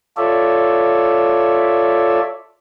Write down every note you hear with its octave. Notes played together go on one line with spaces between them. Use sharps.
F4 A4 C#5 D5 E5